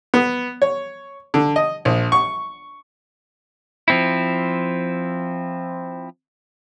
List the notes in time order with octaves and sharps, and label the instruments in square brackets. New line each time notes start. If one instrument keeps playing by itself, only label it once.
[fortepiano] B3
C#5
D3
D#5
A#1
C#6
[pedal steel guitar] F3 C4 E4